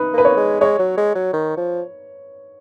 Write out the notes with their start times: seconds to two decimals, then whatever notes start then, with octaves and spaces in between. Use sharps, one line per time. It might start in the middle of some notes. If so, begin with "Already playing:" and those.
Already playing: D#4 B4
0.13 A#3 B4
0.25 C#5
0.37 G#3
0.61 G#3 C#5
0.79 F#3
0.97 G#3
1.15 F#3
1.33 D#3
1.57 F3